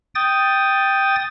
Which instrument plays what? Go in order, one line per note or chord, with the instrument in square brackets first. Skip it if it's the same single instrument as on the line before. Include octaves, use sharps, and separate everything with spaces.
[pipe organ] G5 D#6 A6